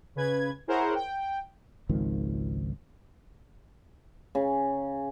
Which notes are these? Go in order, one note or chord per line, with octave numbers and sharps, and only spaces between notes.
C#3 B4 G#6
E4 G#4 A#4 C5 C#5 F#5
G5
G#1 C#2 D#3 F3
C#3